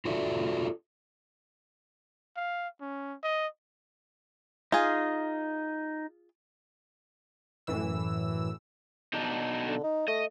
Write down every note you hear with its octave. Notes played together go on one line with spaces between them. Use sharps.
F4 F#4 A4 D5 E5
F5
C#4
D#5
D#4 F4 G#4
F#2 A2 E3 E6
B2 D4 D#4
D3
D#4
A3 D#5